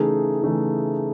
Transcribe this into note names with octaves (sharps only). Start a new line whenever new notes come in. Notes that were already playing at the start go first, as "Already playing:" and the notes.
Already playing: C#3 E3 A3 D#4 G#4
C#3 E3 A3 D#4 G#4